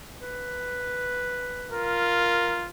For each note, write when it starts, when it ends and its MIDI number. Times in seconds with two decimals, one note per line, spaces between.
0.21 1.82 71
1.71 2.70 65
1.71 2.64 70